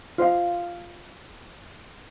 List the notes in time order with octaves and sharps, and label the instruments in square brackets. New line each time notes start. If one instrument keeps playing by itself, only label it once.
[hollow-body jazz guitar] F4 C5 D#5 F5